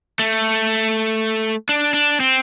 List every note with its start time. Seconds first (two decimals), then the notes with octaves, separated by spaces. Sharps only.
0.19 A3
1.69 D4
1.94 D4
2.20 C4